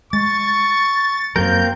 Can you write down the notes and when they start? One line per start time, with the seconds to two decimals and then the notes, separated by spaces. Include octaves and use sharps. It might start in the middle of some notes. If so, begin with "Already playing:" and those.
0.13 G#3 C#6 A6
1.36 F#2 F#3 A#3 C4 A#4 G6